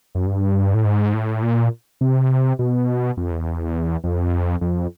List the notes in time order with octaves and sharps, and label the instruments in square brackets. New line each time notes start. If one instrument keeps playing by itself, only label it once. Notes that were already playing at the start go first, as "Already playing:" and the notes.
[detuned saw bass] F#2
G2
A2
G#2
A2
A#2
C3
B2
F2
E2
F2
F2